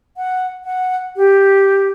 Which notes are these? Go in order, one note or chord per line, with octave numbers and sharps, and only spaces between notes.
F#5
F#5
G4